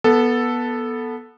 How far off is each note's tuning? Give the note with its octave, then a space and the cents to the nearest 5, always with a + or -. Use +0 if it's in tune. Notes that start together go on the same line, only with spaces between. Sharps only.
B3 -15 A4 +0